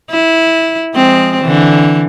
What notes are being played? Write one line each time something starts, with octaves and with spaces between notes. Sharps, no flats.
E4
F3 G#3 C4
D3 E3